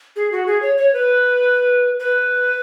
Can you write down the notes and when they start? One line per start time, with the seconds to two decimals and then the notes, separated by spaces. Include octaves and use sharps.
0.16 G#4
0.32 F#4
0.47 G#4
0.62 C#5
0.78 C#5
0.93 B4
2.00 B4